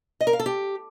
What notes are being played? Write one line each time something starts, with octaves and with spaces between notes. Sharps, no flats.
D#5
A#4
F5
A4
G4